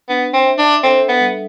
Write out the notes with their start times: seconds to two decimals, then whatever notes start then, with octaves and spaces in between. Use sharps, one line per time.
0.09 B3 D4
0.34 C4
0.46 E5
0.58 D4
0.83 C4 A4
1.09 B3
1.21 G3